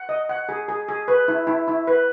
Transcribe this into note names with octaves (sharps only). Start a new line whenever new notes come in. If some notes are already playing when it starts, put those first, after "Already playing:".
Already playing: F#5
D#5
F#5
G#4
G#4
G#4
B4
E4
E4
E4
B4